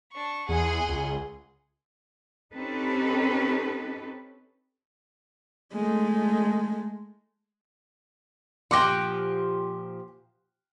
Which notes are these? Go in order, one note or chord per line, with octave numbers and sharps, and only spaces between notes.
D4 C#6
E2 G#4 F#5 C6
C#2
C4 C#4 D#4 G4 A4 B4
G#3 A3
A#2 F3 G4 F#5 G5 C6 D6 A#6